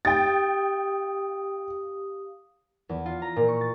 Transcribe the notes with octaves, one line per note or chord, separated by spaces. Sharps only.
G4 F5 G5 D#6 A6
E2
F4
A#5
A#2
C#6
A6